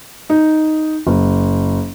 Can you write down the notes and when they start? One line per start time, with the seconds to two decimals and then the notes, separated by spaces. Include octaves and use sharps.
0.30 D#4
1.07 F#1